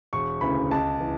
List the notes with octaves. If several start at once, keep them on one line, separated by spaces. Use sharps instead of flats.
E1 C#6
D2 C#3 E3 B5
C#2 A5
E3